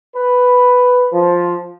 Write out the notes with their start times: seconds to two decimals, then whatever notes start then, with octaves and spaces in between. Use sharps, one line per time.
0.16 B4
1.13 F3